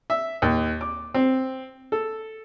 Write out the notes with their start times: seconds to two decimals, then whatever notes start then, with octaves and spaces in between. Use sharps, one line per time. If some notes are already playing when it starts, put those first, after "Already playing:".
0.10 E5
0.42 D#2
0.81 D6
1.14 C4
1.92 A4